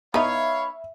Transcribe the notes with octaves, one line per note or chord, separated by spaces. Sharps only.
B3 D#4 C#5 E5 F5 B5